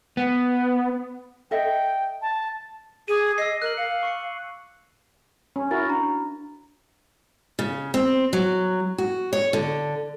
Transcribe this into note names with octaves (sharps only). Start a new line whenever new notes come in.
B3
A4 D#5 E5 G5
A5
G#4 D6 D#7
D#5 E6 C7
A#4 F#6 F#7
F5 C#7
C#6 C7 C#7
C#4
E4 F#4 A#4 A6
D4 A#5
C#3
C4
F#3
F#4
C#5
D3